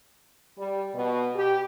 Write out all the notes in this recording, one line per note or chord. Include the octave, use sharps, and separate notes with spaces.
G3
B2
G4